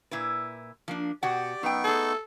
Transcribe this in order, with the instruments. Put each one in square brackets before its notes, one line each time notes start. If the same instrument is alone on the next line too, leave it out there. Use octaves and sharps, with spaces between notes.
[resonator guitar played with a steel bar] A#2 E4 B4
F3 A#3 D4
[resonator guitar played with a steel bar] B2 F#4 F#5 [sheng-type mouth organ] G4 D5 G5
[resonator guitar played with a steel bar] F#2 G5 [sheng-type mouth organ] B3 D#4 C#6
[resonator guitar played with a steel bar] A3 G#4 [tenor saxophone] A4